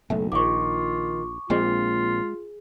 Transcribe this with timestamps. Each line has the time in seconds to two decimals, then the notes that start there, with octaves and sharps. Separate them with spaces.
0.10 F#1 B1 A3
0.32 A#1 D#3 F4 C#6 D6
1.50 A#1 A#2 G#3 C4 F4 G#4